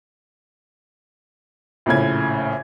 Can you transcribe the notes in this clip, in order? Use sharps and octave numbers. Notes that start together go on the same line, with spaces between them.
A#1 A2 C#3 G#6